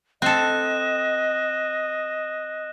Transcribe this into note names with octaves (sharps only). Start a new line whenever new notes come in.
C4 A4 D#5 F#6 E7